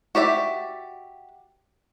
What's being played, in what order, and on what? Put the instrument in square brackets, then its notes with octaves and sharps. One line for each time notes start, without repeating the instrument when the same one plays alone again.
[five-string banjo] F#4 G4 D5 E5